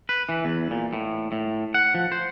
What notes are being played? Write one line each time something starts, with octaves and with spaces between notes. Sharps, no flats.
B4
E3
E2
A#2
A2
A2
F#5
F3
C5